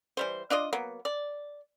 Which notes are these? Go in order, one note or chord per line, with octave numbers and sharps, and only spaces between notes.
E3 G3 C5
D4 F4 D5 D#5
F#3 A#3 B3
D5